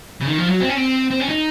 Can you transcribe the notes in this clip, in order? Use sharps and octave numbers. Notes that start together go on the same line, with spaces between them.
C#3
D#3
F3
F#3
C4
C#4
C4
C4
C#4
D#4